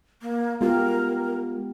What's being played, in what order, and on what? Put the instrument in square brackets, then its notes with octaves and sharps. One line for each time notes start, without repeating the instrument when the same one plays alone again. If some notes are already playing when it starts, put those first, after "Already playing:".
[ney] A#3
[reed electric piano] G#3 F4 [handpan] B3 G4 [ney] A#4